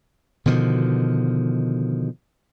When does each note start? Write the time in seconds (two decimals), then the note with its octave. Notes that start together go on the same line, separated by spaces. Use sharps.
0.46 B2 D3 D#3 F3